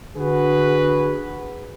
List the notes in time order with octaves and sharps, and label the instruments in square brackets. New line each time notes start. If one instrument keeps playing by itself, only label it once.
[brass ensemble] D3 F#4 G#4 B4